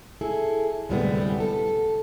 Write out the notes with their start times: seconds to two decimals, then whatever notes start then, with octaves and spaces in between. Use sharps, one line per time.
0.21 E4 G#4 A4
0.89 D2 A2 C3 G3 G#3 B3
1.40 A4